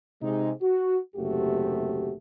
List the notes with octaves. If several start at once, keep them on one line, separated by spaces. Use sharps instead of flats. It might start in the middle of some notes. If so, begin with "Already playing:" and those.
C3 G#3 D#4
F#4
F#1 D#2 C3 A3 F#4 G4